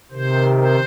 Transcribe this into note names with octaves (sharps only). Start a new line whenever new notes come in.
C3 D#3 C5
C5